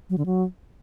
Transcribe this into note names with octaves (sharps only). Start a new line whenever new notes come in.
F#3
D3
F#3